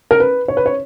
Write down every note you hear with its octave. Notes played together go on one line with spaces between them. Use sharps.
A#4
B4
C#5
B4
C#5